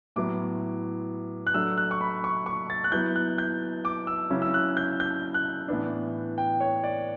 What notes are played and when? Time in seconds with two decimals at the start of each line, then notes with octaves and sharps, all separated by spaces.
0.16 A2 F#3 B3 E4 D6
1.47 F#6
1.54 F#3 A3 D4 E6
1.77 F#6
1.91 C#6
2.01 B5
2.24 C#6
2.46 C#6
2.70 A6
2.84 F#6
2.92 F#3 B3 E4 G6
3.16 F#6
3.38 G6
3.85 D6
4.07 E6
4.30 C#3 F#3 C#4 E4
4.42 E6
4.54 F#6
4.77 G6
5.00 G6
5.34 F#6
5.68 A2 E3 B3 D4
6.38 G5
6.61 C#5
6.84 D5